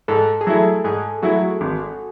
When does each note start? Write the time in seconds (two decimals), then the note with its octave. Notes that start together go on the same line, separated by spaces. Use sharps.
0.08 G#2 A4
0.41 G#4
0.47 F#3 A3 E4 A4
0.84 G#2 G#4
1.22 F#3 A3 E4 F#4
1.61 G#1